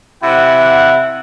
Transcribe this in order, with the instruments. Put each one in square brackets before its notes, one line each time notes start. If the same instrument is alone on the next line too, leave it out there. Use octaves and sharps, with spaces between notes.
[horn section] C3 F#5 [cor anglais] E4